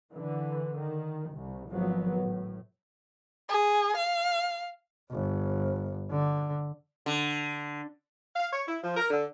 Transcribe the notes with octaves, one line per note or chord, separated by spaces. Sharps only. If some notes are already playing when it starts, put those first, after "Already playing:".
D3 E3
D#3
C2
G#1 F3 F#3 B3
A2
G#4
F5
G1
D3
D3
F5
C#5
E4
F3
A#4
D3